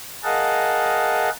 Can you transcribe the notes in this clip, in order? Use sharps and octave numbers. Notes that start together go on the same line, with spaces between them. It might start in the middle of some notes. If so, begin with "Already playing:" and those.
G#4 A#4 D#5 F5 F#5 A5